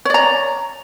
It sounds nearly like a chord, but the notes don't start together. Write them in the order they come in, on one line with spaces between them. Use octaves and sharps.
C#5 D5 A#5